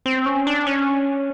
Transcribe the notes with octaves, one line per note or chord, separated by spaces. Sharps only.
C4
C#4
D4
C#4